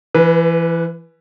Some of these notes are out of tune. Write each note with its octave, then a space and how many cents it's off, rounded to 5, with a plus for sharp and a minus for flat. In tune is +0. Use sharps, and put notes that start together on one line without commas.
E3 +25 B4 -15